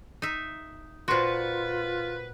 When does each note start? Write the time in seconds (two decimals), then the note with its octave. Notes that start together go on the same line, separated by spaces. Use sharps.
0.22 D#4 E5
1.08 A#2 F4 F#4 B4 C5 C6